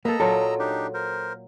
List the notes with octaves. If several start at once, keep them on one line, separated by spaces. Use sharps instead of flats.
A#3 A4 B4 D#5 A#5 E6
A#2 F#3 F4 A4
D4 D#4 G4
A#4 C5